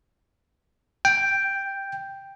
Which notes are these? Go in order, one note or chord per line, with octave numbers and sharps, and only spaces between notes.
G5